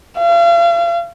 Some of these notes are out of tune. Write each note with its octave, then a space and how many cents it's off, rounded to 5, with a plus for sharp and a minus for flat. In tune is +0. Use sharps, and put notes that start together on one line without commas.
F5 -40